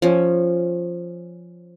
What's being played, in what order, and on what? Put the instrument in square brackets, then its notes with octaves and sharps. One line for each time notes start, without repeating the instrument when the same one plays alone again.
[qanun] F3 C#4